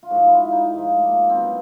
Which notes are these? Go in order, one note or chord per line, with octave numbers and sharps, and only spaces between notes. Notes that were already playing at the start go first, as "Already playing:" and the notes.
F4
G#2 F3 F#4
E4
F4
E4
D#4
G#2 F3
A3
A#3
C4
B2 F#3 B3